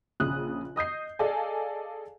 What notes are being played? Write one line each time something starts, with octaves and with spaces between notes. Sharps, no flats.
A#1 C#3 D#6 F#6
D#5 D#6 G6 C7
G#4 A4 D5 D#5 F5 G#5